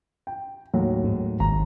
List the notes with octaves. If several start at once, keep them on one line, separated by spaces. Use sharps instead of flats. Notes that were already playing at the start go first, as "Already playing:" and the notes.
G5
D#2 A2 F#3
G#2
G#1 A#5